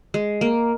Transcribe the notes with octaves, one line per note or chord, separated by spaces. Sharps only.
G#3
A#3